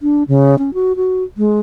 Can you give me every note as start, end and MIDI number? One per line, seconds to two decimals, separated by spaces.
0.01 0.23 62
0.28 0.58 49
0.59 0.74 61
0.74 0.96 66
0.96 1.23 66
1.37 1.60 56